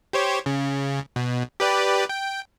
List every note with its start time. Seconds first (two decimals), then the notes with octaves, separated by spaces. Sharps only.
0.13 G4 C5 C#5
0.46 C#3
1.16 B2
1.60 G4 B4 D5
2.09 G5